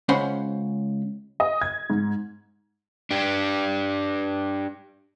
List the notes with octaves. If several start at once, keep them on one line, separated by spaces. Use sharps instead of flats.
C#2 C#4 C5 F#5 B5
D#5
G#6
G#2
D4 G4